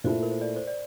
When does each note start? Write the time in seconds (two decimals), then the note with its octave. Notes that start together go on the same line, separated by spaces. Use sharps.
0.04 A#2 A3 E4 A4 C5
0.23 A#4
0.31 C5
0.41 D5
0.56 C5
0.67 D5